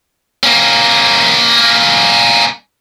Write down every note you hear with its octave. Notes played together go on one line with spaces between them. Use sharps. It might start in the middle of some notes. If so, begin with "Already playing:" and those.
A#3 C#4